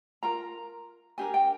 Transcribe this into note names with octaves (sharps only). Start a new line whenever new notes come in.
F4 A#4 A#5
D4 G4 A#4 G#5
G5